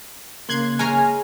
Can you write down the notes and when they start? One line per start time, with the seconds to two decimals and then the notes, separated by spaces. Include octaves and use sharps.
0.49 C#3 A#3 C6 F#6 G#6
0.79 G#3 C#5 G#5 A#5 F6